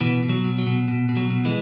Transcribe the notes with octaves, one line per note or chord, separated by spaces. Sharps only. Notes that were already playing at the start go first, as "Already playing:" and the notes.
B2 E3
B2
F#3
B2
F#3
B2
B2
B2
F#3
B2
E3 G#3